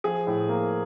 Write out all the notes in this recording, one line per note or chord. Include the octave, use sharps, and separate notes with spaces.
F3 G#4
A2
A#3